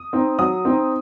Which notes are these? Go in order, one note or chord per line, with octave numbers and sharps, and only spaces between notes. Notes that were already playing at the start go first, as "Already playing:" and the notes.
Already playing: D#6
C4 D#4
F#3 D#6
C4 D#4